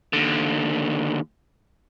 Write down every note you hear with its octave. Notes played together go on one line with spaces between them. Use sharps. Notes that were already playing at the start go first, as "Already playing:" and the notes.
D#2 D3